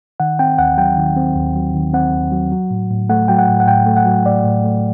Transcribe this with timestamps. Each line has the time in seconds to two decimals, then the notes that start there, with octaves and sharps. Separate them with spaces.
0.20 D#3 F#5
0.39 C4 G5
0.59 D#2 F#5
0.78 F#3 G5
0.97 D#3
1.17 C4
1.36 D#2
1.55 F#3
1.75 D#3
1.94 C4 F#5
2.13 D#2
2.32 F#3
2.52 F#3
2.71 A2
2.90 A2
3.09 A3 F#5
3.28 F#3 G5
3.38 F#5
3.48 A2
3.60 F#5
3.67 A2 G5
3.86 A3
3.97 F#5
4.06 F#3
4.26 A2 D5
4.44 A2
4.64 A3